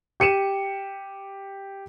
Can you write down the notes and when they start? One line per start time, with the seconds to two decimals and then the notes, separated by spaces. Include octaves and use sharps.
0.20 G4 C#7 D#7 E7